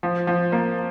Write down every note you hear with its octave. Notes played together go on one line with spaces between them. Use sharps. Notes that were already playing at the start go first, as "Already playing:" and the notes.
F3
F3
A#3